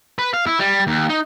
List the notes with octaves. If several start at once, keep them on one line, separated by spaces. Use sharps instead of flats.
B4
F5
E4
G3
D#2
D#4